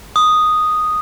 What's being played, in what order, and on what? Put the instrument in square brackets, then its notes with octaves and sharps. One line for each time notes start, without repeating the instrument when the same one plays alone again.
[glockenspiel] D#6